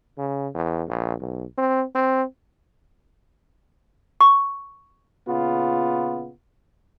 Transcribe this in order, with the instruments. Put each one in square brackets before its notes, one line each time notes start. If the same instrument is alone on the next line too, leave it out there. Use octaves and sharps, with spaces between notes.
[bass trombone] C#3
E2
A#1
B1
C4
C4
[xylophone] C#6
[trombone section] A#2 C#3 B3 F4